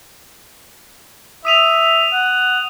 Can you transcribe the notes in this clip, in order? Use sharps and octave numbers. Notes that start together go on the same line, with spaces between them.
E5 D#6 D#7 F7
F#5